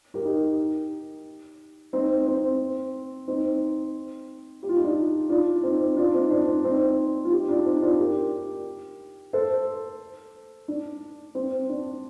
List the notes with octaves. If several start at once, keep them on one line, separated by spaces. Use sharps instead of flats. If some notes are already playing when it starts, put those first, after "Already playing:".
G4 A#4
D#4 G4
C4 D#4
C4
C4 D#4
G4
F4
D#4
D4 F4
D4 F4
C4 D#4
D4 F4
C4 D#4
D4
C4
C4 D#4
F4
D#4 G4
D4 F4
C4 D#4
D4 F4
G4 A#4
A4 C5
D4
C4
D4